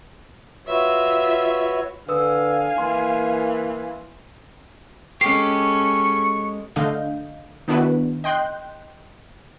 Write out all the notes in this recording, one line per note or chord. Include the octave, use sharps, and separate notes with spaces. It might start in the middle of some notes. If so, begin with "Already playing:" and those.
F4 F#4 B4 C#5 E5
D3 B4 F5 G#5 D#6 E6
E3 A#3 C6
G#3 C#4 G4 A4 C#6 C7
D3 A3 D4 D#5 F5 G6
D#3 B3 D4 E4 F#4 B4
D#5 G5 C6 F#6 G6